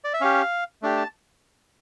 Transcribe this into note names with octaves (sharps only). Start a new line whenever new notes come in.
D5
E5
C#4 G4 F5
A3 D4 G4
A5